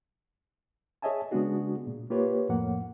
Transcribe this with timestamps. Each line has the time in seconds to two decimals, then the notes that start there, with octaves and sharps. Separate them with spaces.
1.02 G#4 C#5 D#5 E5 G#5 A5
1.31 C#3 G#3 B3 D4 F#4 G#4
1.87 A#2
2.10 A#3 F4 G4 B4 C#5
2.49 F2 A2 F3 A#3 F#5